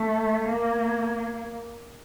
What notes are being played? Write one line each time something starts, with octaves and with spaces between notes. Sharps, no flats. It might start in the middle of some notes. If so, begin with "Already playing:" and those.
Already playing: A3
A#3